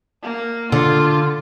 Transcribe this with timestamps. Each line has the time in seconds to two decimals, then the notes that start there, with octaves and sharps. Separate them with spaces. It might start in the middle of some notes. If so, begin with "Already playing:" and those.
0.23 A#3
0.72 D3 F4